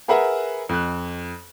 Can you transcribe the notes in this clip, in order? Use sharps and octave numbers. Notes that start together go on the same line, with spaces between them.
G#4 A#4 B4 E5 F#5 A#5
F2 F#6